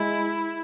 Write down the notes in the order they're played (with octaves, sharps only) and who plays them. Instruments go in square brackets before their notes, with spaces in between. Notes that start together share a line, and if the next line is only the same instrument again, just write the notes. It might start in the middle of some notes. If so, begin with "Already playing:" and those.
Already playing: [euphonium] G#3 [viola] E4